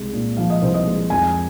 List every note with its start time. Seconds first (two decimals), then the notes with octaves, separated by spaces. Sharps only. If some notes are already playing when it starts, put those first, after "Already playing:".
Already playing: C2 G#3
0.13 A#2
0.37 F3 F5
0.50 D#5
0.62 C2 C5
0.74 D#5
0.87 G#3
1.10 F2 G#5